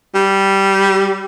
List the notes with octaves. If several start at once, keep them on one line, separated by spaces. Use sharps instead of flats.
G3